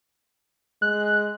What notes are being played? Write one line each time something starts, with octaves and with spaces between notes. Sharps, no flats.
G#3 F#6